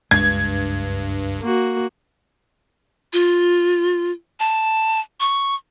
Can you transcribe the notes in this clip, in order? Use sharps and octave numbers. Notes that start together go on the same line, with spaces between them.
F#1 C#2 G2 G#3 G#6
A#3 F#4
F4
A5
C#6